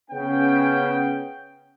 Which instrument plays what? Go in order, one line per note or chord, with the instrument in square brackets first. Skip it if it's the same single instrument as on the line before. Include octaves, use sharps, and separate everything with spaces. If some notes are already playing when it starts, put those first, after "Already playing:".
[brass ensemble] C#3 B3 C#4 G5